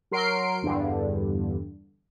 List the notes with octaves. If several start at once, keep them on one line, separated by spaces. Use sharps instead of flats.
F#3 A#4 C6 C7 D7
E2 G2 D3